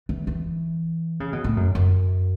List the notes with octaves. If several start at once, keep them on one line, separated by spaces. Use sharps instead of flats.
E3
E3
C#3
B2
A2
F#2
F#2